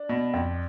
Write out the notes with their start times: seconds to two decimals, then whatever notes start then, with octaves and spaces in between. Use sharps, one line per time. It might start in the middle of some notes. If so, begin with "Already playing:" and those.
Already playing: D4
0.09 B2
0.34 F2